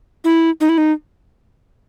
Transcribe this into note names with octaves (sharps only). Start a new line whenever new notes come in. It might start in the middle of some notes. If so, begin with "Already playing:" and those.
E4
D#4
E4
D#4